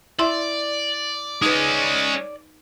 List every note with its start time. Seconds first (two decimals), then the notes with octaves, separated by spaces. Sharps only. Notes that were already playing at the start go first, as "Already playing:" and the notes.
0.19 E4 D5 E5 C6
1.42 G#3 C#4 D#4 B4